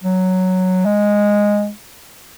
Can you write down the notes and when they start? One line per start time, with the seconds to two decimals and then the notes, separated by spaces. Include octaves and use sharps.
0.03 F#3
0.85 G#3